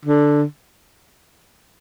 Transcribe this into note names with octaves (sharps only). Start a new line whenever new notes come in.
D3